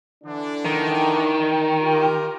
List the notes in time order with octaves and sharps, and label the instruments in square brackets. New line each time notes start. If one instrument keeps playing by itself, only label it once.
[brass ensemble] D3 E3 D4
[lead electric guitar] D#3
[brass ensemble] F4 G4 A#4